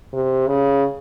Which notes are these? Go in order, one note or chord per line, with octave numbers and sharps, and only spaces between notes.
C3
C#3